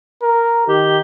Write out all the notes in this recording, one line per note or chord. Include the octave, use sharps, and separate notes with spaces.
A#4
D#3 G4